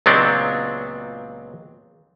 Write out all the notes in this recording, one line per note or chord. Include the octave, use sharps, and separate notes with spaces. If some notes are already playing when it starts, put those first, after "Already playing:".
C#2 A#2 F#3 B3 C4 D4